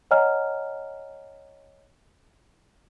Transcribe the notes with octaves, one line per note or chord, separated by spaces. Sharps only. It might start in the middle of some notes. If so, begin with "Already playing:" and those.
C#5 D#5 F#5 G#5 A#5 F6